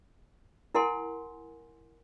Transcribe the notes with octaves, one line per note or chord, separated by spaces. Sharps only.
E4 A#4 F#5 G#5 C6